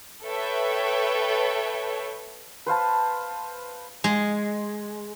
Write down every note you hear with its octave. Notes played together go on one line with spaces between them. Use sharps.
A4 B4 C#5 E5 G5
B4 C5 F5 A5
G#3